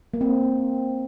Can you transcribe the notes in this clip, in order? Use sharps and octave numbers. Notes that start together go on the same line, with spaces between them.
A#3
C4